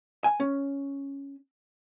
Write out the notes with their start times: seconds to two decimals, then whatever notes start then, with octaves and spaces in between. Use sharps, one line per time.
0.24 G#5
0.40 C#4